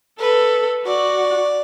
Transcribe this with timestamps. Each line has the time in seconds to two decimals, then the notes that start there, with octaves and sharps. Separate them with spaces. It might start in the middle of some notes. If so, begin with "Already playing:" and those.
0.19 A4 B4
0.86 F#4 D5